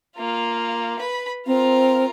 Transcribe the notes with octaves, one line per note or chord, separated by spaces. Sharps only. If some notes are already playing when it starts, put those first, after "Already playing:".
A#3 F4
B4 B5
C4 F4 A#4